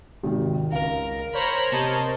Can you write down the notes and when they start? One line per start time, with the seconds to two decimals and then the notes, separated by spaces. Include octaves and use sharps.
0.23 G#1 C3 D#3
0.72 C#2 A#4 F5
1.34 A#4 C5 C#5 A#5 B5
1.72 C3 D#5 A5